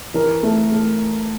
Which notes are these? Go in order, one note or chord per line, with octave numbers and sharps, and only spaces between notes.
E3 A#4
A3
A3